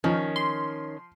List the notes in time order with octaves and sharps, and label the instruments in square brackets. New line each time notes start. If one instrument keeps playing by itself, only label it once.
[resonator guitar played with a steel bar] D#3 C#4 [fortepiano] F3
[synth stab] C6